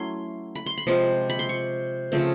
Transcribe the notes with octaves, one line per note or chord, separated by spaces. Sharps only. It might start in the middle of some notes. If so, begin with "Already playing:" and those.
Already playing: F#3 A3 C#4 E4 C6
B5
C6
B5
C3 F3 G#3 C4
B5
C6
C#6
C#3 F3 A3 C4